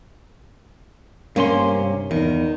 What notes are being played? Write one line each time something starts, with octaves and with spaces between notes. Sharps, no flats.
G2 C3 A#3 C#4 C6
E2 D#3